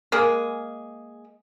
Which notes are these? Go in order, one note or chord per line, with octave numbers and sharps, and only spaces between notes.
G#3 A#3 G#4